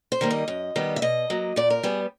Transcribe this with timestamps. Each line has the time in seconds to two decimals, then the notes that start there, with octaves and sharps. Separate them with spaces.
0.12 C5
0.21 D#3 G3 A#3
0.30 D#5
0.48 F#2
0.76 D#3 G3 B3
0.96 E5
1.02 B2 D#5
1.30 F#3 A#3
1.56 A#2 D5
1.70 A#4
1.83 G3 B3 G#4